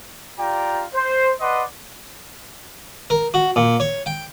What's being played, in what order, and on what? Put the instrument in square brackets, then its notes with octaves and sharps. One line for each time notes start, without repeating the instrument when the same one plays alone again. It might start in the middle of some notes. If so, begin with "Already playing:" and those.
[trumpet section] F4 G4 D5 G5 A#5
C5
B4 D5 D#5 F#5 C6
[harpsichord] A#4
F#4
A#2
C#5
G5